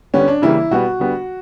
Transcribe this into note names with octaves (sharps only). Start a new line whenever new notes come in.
D3 G3 B3 C#4
D4
C#3 E3 G3 A#3 E4
B2 G3 B3 F#4
D3 G3 B3